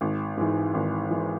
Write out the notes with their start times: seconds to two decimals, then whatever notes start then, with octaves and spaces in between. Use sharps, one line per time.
0.01 G#1
0.37 G#2 E3
0.74 G#1
1.10 E3